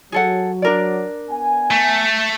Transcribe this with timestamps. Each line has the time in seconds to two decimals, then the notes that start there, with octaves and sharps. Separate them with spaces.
0.12 F#3 G#4 A4 F#5
0.62 D4 A#4 D5
1.30 B3 G#5
1.71 A3